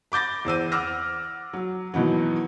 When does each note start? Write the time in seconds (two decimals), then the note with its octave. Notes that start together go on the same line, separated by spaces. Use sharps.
0.12 B5 D6 G6 A6 A#6
0.45 E2 C5 E6 D#7
0.72 F#5 D6 E6 F6 A#6
1.53 F#3
1.94 B2 D#3 E3 F#3